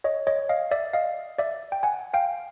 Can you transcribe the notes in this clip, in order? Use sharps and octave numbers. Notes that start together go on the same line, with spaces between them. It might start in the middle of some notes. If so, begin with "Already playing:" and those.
C#5 D#5
C#5 D#5
D#5 F5
D5 E5
D#5 F5
D5 E5
G5
F#5 G#5
F5 G5